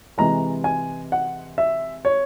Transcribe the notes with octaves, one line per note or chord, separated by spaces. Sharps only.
C3 E3 G#3 A#5
G#5
F#5
E5
C#5